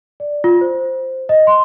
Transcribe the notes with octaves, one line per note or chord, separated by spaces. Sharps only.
D5
F4
C5
D#5
C6